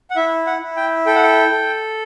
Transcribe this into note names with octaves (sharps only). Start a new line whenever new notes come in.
F#5
E4 E5
F#5
E4
G5
A4 G5
F#5
G5
A4